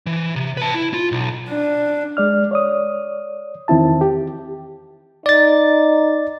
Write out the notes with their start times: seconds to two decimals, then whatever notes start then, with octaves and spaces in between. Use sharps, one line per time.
0.06 E3
0.36 C3
0.57 B4 A5
0.74 E4
0.94 F4
1.12 B1
1.50 D4
2.17 G#3 D5 F6
2.51 C#5 D5 D#6
3.68 E2 D#3 C4 E4 A5
4.01 G4
5.26 D#4 D5 A6